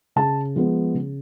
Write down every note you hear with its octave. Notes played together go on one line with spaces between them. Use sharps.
C#3 A5
F3 G#3 B3
C#3